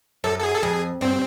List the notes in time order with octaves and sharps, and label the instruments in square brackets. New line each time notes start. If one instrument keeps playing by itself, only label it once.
[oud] F#2 [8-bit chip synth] A4
[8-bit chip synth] A4
G#4
A4
[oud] F2 [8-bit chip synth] G#4
[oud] G2 [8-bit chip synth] C4